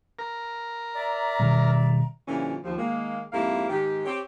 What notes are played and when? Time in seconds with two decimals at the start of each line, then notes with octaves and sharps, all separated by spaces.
0.19 A#4
0.95 D5 E5 A#5
1.40 B2 D#3 G3
2.28 G2 A#2 D3 E3 F3 C#4
2.64 D#2 F3
2.78 D#3 G#3 A#3
3.33 F2 G#2 A#3 E4 G4 F5
3.70 G#2 D#3 G4
4.06 C4 G4 C#5